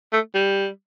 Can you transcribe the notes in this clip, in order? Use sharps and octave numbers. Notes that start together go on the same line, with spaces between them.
A3
G3